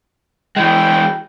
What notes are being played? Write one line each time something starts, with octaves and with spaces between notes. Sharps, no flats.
E3 G#3 G5